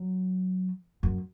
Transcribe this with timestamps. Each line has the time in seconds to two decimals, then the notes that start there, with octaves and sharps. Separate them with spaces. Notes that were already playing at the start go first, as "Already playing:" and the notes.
Already playing: F#3
1.03 F#2